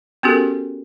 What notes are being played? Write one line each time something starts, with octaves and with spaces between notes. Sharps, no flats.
B3 C#4 F#4 G4 A4 A#4